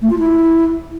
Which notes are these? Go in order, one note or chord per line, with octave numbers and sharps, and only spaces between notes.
A3
F4
E4